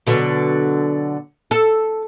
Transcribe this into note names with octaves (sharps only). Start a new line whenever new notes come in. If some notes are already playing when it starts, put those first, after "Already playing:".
B2 D3 F#3
A4